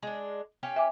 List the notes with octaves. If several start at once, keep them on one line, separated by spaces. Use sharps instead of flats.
G#3 D4
C#4 G4 F5
E5 G#5 D6